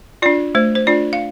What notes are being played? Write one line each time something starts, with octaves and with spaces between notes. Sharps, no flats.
D4 F4 D5
A3 C5
C5
D4 F4 D5
F5